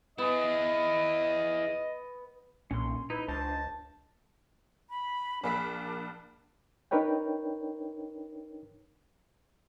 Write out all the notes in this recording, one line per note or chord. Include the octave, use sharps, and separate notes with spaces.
B3 E4 G#4 D#5
B1 A#2 C#4 C6
D#4 E4 B4
C#2 D4 C5 D#5 A5
B5
A#1 A#3 D4 G#5 B5 E6 B6
D4 D#4 A#4 B4 C#5 G5